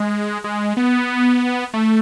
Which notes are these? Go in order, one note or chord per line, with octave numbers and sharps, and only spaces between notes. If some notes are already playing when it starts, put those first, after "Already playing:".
Already playing: G#3
G#3
B3
A3